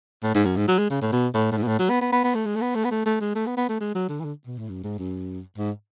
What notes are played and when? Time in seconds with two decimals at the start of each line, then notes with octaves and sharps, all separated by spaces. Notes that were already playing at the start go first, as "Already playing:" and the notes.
0.23 A2
0.35 G#2
0.45 F#2
0.57 G#2
0.68 F#3
0.79 G#3
0.90 C#3
1.02 A2
1.13 B2
1.34 A2
1.52 A2
1.57 G#2
1.63 B2
1.68 A2
1.79 F#3
1.90 B3
2.01 B3
2.13 B3
2.24 B3
2.35 A3
2.46 G#3
2.56 A3
2.61 B3
2.75 A3
2.85 B3
2.91 A3
3.06 A3
3.21 G#3
3.35 A3
3.46 B3
3.57 B3
3.69 A3
3.81 G#3
3.95 F#3
4.09 D3
4.20 E3
4.25 D3
4.47 B2
4.58 A2
4.69 F#2
4.84 G#2
4.99 F#2
5.58 G#2